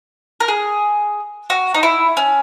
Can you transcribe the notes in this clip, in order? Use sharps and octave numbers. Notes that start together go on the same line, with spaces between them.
A#4
G#4
F#4
D#4
E4
C#4